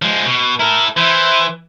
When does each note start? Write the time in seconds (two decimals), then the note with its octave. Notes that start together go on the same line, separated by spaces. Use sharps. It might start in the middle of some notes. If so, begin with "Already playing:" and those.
0.02 F3 G#3
0.25 B2
0.60 E4 A4 A#4
0.97 E3 E4 C5